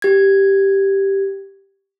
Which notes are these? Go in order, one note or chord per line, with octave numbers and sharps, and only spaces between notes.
G4 G#6